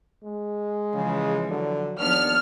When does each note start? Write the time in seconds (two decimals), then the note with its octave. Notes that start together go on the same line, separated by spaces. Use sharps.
0.24 G#3
0.95 C#3 E3 F3
1.51 D3 F#3
2.00 D#2 F3 B3 D4 F6